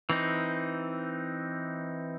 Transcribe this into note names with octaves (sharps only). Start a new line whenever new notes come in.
E3 C4 D#4